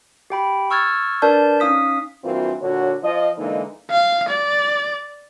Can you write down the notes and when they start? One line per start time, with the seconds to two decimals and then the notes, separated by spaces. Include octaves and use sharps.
0.30 G4 G5 B5
0.70 C#6 E6 F6 G#6 A6
1.22 D4 A#4 B4 D5 A5 G6
1.60 C#4 D#4 F5 D#6 B6
2.23 G2 E3 A#3 C4 F4 F#4
2.60 A#2 D3 F#4 C#5
3.02 F3 D#5
3.38 D3 E3 G#3 A#3 D#4
3.91 F5
4.29 D5